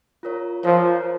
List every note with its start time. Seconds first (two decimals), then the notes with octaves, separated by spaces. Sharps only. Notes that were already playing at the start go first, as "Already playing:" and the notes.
0.23 F4 A#4 C#5
0.64 F3 F4 A#4 C#5